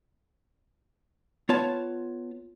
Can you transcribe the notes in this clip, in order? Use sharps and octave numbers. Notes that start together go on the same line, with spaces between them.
B3 F4 C#5 A5